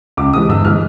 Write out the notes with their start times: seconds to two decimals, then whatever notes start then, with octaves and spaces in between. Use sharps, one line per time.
0.17 C#2 D6
0.33 C3 E3 G#3 D#6
0.49 G1 E6
0.65 E3 G#3 F6